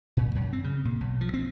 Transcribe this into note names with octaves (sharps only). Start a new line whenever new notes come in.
A#2
F#2
C4
C#3
A#2
B1
F3
C4